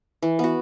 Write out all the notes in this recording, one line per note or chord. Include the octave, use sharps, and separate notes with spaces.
E3
B3 F#4